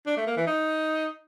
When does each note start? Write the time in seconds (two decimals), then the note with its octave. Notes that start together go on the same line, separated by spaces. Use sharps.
0.07 D4
0.17 A3
0.27 A#3
0.37 E3
0.47 D#4